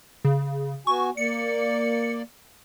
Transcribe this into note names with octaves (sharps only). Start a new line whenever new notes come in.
C#3
B3 F#4 G#5 C#6
A#3 D5 C#7